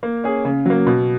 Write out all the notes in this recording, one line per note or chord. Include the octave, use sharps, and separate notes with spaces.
A#3
C#4 G#4
C#3
F#3 A#3
B2